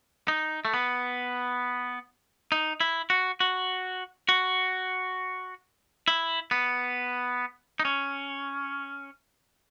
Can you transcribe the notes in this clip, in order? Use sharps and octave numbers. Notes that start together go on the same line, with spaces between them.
D#4
A3
B3
D#4
E4
F#4
F#4
F#4
E4
B3
D#4
C#4